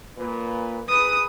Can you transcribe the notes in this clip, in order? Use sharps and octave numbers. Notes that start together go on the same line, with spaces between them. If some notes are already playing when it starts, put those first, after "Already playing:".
A#2 B4
G#4 A#4 B4 D#6